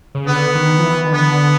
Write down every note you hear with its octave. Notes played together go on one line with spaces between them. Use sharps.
C#3
D3 B3
D#3
F3
E3
D#3
D3 B3